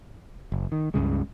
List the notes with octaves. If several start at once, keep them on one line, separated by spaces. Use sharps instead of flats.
F#1
D#3
C#2 G2 C#3 G#3